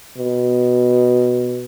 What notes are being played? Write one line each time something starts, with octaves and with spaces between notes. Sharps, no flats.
B2